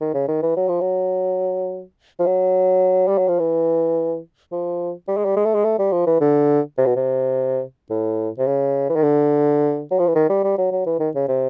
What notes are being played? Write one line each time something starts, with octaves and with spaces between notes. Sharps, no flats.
D#3
C#3
D#3
E3
F#3
F3
F#3
F3
F#3
G3
F#3
F3
E3
F3
G3
G#3
G3
G#3
A3
G#3
A3
G3
F3
E3
D3
C3
B2
C3
A2
C3
C#3
E3
D#3
D3
F#3
F3
E3
D#3
G3
G3
F#3
F#3
E3
D#3
C#3
C3